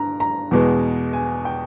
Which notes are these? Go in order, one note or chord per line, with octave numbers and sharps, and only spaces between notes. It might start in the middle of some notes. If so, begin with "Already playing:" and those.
Already playing: G2 A#5
A#5
E2 B2 G#3
G#5
G5